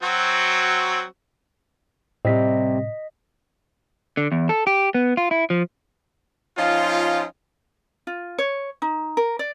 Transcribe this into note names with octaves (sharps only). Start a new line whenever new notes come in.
F#3 C4 F#4
A2 C3 G3 C4 D#5 B6
D3
E2
A4
G4
B3
F4
E4
F3
F3 C#4 D#4 F4
F4
C#5
D#4
A#4
D5